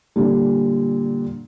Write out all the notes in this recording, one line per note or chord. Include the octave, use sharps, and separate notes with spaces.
A#2 D3 G3